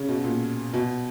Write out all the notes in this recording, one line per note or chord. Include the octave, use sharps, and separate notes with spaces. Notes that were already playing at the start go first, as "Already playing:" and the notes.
Already playing: C#3
B2
A#2
B2